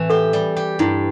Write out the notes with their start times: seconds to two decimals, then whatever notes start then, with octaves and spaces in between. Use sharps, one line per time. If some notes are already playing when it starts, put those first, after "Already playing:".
Already playing: A2 E3 C4
0.10 G4 A4
0.33 G3
0.56 G4
0.79 G2 E4